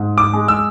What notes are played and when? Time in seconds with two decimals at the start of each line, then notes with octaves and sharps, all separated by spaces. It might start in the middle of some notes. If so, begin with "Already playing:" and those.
Already playing: G#2
0.18 D6
0.33 G#3
0.48 E6